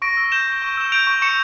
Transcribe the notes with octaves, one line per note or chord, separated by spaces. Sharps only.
C#6 A#6 D7
E6
G6 E7 G7
C#6
C#6
E6 E7
G6 D7 F7
C#6
C#6 C#7 E7